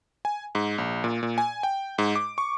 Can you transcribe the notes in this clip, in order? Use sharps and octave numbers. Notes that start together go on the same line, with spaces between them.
G#5
G#2
A#1
A#2
A#2
G#5
G5
G#2
D6
C#6